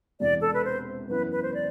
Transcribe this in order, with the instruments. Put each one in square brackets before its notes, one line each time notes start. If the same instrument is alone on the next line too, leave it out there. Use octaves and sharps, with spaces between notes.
[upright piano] E1 E2 C3 E3 [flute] D5
[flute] A4
B4
C5
[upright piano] F#2 E3 B3 E4 [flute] B4
[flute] B4
C5
D5